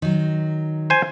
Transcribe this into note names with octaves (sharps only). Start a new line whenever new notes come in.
D#3 F#3
C5 G#5